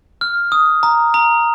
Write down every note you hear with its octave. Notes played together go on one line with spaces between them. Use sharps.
F6
D#6
A#5
A#5